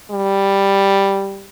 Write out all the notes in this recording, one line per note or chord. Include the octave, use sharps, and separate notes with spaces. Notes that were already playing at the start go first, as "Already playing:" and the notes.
G3